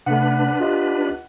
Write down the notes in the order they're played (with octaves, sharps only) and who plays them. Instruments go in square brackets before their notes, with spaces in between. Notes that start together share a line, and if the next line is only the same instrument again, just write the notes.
[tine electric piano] C3 A3 [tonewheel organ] D4 B4 [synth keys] F#5
[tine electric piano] F4 G4 D#5